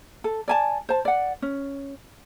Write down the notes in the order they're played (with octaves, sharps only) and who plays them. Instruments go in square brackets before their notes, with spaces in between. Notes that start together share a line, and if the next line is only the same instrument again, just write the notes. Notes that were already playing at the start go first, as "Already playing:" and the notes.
[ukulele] A4
D5 G#5 A5
C5 A5
D5 F#5
C#4